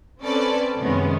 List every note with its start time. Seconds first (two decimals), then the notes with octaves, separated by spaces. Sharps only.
0.22 C4 C#4 A4 B4 C5 D5
0.77 F#2 C3 D#3 G#3 B3 C#4